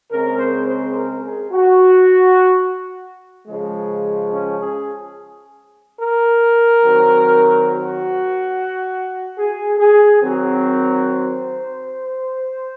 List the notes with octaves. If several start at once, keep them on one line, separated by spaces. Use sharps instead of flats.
C#3 G#3 C4 A#4
C5
C5
A#4
G#4
F#4
C#3 F3 G#3
C#4
G#4
A#4
D#3 F#3 C4
F#4
G#4
G#4
D#3 F#3 C4
C5